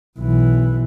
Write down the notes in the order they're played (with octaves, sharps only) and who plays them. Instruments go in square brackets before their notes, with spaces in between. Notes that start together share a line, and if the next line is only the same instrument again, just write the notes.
[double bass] B1 E3